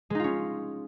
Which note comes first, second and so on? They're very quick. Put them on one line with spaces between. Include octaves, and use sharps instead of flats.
G#3 D#4 F4 C#4